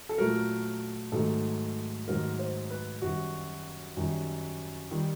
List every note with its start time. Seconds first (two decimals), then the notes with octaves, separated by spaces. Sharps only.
0.09 A4
0.18 A#2 F#3 A3 A#4
1.12 G#2 D#3 F#3 A3 A4
2.08 G#2 D#3 F#3 A3 A#4
2.39 C5
2.70 B4
3.02 F#2 D#3 G3 F#4
3.97 F#2 D#3 G3
4.91 D#3 G3